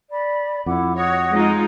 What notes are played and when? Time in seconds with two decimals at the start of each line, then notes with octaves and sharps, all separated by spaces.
0.11 D5 B5
0.66 F2 E4 F#5 D6
0.96 F#4 C#5 D#5 D#6
1.35 G#3 D#4 F4